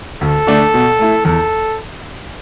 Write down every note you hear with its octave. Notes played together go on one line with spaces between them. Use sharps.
D2 A4
D3 A3 D4
B2
A3 E4
E2 A4